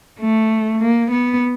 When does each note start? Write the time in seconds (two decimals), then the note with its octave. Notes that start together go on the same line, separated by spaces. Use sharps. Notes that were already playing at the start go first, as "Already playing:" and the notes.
0.20 A3
0.81 A#3
1.11 B3